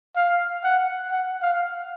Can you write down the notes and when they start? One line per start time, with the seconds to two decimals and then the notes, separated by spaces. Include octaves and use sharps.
0.16 F5
0.63 F#5
1.11 F#5
1.42 F5